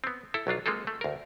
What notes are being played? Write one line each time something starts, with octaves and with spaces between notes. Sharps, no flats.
B3 C4
E4 A4
B1 F#3 D4 F4
G#3 A#3 C4 F4 A4
A3
D2 A#4